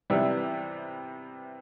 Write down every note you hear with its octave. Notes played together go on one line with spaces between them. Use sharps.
C3 E3 G3 B3 E4